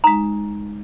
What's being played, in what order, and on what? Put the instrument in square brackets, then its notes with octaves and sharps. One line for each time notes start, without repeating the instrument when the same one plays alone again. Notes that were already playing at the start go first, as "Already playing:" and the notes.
[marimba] G#3 D#4 [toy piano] A#5